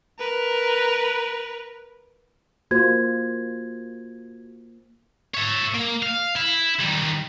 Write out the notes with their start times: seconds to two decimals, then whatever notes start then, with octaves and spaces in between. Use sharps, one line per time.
0.19 A#4 B4
2.71 A#3 F4 F#4 C5 G#6
5.35 C#5 E5
5.74 A#3
6.02 F5
6.36 E4
6.80 D#3 G3